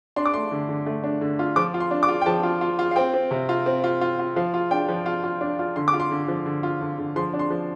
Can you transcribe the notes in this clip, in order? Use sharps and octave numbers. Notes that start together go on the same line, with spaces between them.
D4 C6
D6
A3 C6
D3
D3
A3
D4
D3
F4
F3 D6
F4
C6
D4
D6
F4
G5
F3 A5
F4
F4
F4
F5
C4 G5
C4
C3
F4
C4
F4
F4
F4
F3 F5
F4
D4 G5
F3
F4
F4
D4
F4
D3 C6
D6
F4
C6
D3
F3
D3
F4
D3
D3
F3 C6
D4
C6
F3